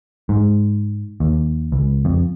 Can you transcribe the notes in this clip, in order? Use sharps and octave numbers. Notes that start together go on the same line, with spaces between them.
G#2
D#2
C#2
F2